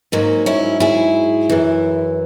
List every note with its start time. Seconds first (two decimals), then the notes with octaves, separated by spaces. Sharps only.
0.12 G#2 F#3 A#3 C#4
0.46 C#4 E4
0.80 E4 G#4
1.49 F#2 E3